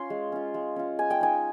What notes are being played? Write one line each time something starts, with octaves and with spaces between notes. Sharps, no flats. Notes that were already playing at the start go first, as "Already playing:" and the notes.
Already playing: C#4 F4 C6
G#3
C#4 F4
G#3
C#4 F4
G#3 G#5
G5
D#4 G#5